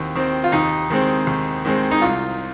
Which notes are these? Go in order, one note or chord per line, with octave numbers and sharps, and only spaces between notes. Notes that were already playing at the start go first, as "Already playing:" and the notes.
Already playing: D#2 D#3 C4
D#3 C4
F4
D#2 D#4
D#3 G#3 C4
D#2
D#3 G#3 C4
D#4
C2 F4